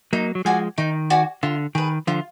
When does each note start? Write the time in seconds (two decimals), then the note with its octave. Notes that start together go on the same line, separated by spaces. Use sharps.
0.13 F#3 A#3 D#4
0.35 F#3
0.45 F3 G#3 F#4 D5 G#5
0.78 D#3 D#4
1.10 F#4 D5 G#5
1.43 D3 F4
1.75 D#3 G#4 B4
2.07 D3 F3 F4